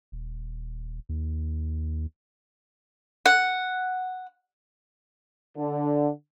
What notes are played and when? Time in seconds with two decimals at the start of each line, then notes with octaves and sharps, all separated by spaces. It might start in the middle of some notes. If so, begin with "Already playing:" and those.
0.12 D#1
1.09 D#2
3.26 F#5
5.56 D3